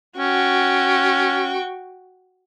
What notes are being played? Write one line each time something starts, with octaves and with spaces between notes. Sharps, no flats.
C#4 F#4 G5 C#6